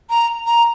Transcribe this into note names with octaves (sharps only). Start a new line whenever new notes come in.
A#5
A#5